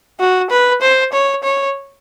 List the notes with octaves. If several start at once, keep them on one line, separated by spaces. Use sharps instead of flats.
F#4
B4
C5
C#5
C#5